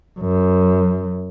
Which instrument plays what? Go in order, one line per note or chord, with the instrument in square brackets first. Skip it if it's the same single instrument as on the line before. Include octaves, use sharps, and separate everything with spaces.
[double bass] F#2